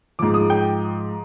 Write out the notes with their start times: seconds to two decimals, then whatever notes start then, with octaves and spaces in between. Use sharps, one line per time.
0.19 G#2 F3 D6
0.34 D#6
0.50 G5